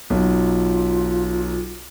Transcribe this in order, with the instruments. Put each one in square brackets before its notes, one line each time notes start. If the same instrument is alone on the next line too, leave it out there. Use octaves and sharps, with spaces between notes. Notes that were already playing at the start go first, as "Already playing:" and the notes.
[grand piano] B1 [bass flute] F4